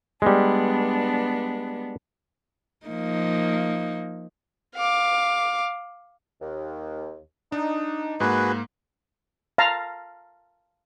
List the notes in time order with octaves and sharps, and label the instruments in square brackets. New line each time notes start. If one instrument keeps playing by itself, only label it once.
[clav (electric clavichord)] G3 G#3 [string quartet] B3 D4
[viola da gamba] F3 A#3 D#4
[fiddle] F5 D6
[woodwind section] D#2
[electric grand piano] D4 [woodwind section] D#4
[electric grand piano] G#2 A#3 [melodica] F#4 G#4 B4
[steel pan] F5 A5 A#5